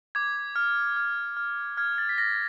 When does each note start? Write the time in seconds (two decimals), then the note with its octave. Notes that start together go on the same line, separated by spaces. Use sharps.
0.15 D6 G#6
0.56 F6
0.96 F6
1.37 F6
1.77 F6 G#6
1.98 A6
2.09 B6
2.18 F6 A#6